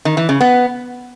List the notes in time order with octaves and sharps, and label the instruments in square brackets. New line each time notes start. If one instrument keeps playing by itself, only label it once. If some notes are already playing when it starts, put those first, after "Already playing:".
[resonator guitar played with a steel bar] D#3
E3
C#3
B3